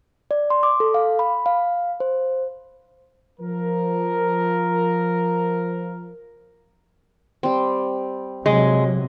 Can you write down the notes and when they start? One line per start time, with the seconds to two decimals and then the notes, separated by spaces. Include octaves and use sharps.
0.31 D5
0.50 C6
0.63 D6
0.80 A4
0.94 F5
1.19 B5
1.46 F5
2.00 C5
3.40 F3 A#4
7.43 G3 C4
8.46 C3 F#3 G#3 D#5